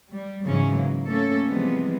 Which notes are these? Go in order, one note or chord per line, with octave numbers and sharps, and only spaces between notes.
G3
G#2 C#3 E3 F#3 C#4
A#3
A3 A#3 C#4 A4
C3 E3 F3 G3 G#3 B3